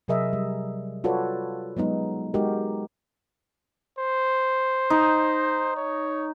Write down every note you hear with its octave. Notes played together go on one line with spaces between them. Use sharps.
C3 F#3 G#4 A#4 D#5 E5
G3
F4 F#4 A4 B4 C#5 D5
F#3 G#3 B3 D#4
G#3 D#4 F#4 G4 A#4
C5
D#4
C#5